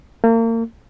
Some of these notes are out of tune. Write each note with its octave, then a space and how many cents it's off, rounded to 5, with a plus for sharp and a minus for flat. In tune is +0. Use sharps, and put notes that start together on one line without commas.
A#3 -35